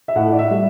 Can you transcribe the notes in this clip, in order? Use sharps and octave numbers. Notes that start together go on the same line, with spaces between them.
E5
A2 F#5
D5
E5
G3